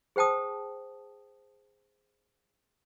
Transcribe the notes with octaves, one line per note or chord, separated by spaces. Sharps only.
G#4 C5 G5 A5 D#6